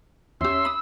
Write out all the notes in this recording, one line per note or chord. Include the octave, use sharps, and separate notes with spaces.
E2 C#4 G4 E5 C6 E6
B5 D#6